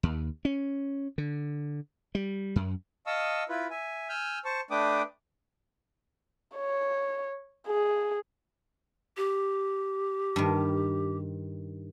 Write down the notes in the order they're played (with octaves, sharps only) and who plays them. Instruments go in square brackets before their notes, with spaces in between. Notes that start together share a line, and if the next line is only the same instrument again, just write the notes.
[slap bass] D#2
C#4
D3
G3
F#2
[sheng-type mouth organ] D#5 F5 A5 C#6 D#6 E6
E4 F4 B4
E5 G#5
G#5 E6 F6 G6
C5 A5 C#6
A3 D4 B4 G5 D6 D#6
[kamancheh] C#5
G#4
[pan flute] G4
[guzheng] G2 D#3